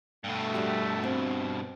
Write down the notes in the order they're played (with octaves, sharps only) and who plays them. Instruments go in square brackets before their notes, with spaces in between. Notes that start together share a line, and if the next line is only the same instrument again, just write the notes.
[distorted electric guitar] G2 B2 [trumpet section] A3
[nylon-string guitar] G3 F#4 G4
C4